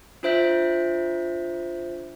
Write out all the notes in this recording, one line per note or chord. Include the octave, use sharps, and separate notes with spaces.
D4 F4 C5 E5 G6 B6